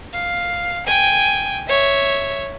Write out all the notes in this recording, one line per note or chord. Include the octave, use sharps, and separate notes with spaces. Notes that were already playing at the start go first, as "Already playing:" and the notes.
F5
G5 G#5
C#5 E5